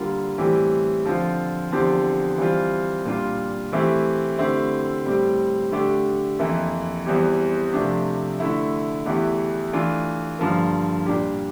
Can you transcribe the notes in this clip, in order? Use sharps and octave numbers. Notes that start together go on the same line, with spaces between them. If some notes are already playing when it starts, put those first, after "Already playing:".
Already playing: D3 G3 A#3 F4
A2 E3 G3 C4 G4
D3 F3 C4 F4
E2 D3 F3 C4 G4
E3 G3 C4 F4
A#2 G3 D4 F4
E3 A3 C4 E4 G4
D3 A3 C4 E4 G4
A2 G3 C4 G4
D3 A3 D4 G4
F2 E3 A#3 E4
E2 E3 G3 C4 G4
C3 F3 A3 D4 G4
D3 A3 E4
E2 E3 A3 E4 G4
E3 A3 D4 F4
G2 D3 F3 A#3
A#2 G3 D4 G4